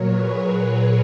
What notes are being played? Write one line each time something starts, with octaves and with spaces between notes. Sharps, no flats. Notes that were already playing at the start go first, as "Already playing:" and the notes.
Already playing: A#2 F#3 A#4 C#5
G#4 B4